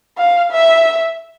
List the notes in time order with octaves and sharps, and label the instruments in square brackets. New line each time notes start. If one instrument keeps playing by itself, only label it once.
[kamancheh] F5
E5